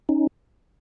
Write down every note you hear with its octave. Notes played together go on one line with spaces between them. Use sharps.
C#4 D#4